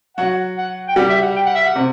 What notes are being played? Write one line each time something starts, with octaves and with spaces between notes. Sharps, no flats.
F#3 F#4 F#5
F#5
G5
G3 G4 F#5
E5
F#5
G5
F#5
E5
F#5
C3 C4